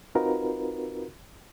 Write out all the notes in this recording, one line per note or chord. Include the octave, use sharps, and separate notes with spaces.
C4 D#4 F4 F#4 A#4 B4